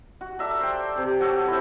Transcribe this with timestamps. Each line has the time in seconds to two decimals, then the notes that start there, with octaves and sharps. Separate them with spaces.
0.21 F#4
0.39 A4 D5 E5 A#5
0.60 C5 G5
0.96 C3 G4
1.20 F#4 G4 A4 C#5
1.47 F3 E4